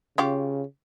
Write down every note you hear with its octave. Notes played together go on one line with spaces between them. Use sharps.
C#3 C#4 F4 G4